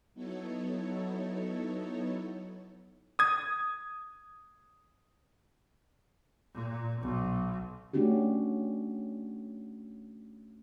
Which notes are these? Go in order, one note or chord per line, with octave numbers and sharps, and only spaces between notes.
F#3 B3 D#4 E4 A4 C#5
D#6 G#6
A#2
B1
A3 C#4 D4 F#4 G4